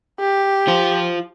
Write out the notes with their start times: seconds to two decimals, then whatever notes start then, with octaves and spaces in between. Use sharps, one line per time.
0.20 G4
0.67 F4 C5